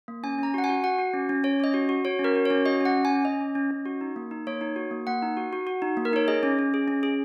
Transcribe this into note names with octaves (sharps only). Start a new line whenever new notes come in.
A#3
C#4 G#5
C#4 A#5
F#4 F#5
G#5
F#4
F#4 F#5
F#4
C#4
C#4
C#4 C#5
C#4 D#5
F#4
F#4
F#4 C#5
C#4
A#4
F#4
C#4 C#5
F#4 D#5
C#4 F#5
C#4
G#5
C#4
C#4 D#5
C#4
C#4
C#4
F#4
D#4
A#3
D#4
A#3 C#5
D#4
F#4
A#3
A#3 F#5
D#4
F#4
F#4
F#4
D#4
A#3
A#4
D#4 C#5
G#4 D#5
C#4
C#4
G#4
C#4
G#4